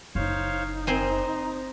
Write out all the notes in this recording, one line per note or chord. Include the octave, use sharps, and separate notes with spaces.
F#1 D#4 C5 C#5 F5
C4 C5 G#5 A#5